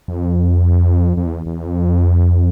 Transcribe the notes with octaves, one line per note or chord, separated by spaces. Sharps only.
F2
F2
E2
E2
F2